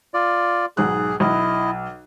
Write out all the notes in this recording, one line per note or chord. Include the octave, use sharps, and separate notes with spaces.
F4 D5
B1 G#2 G#4 F#6
B1 E4 D#5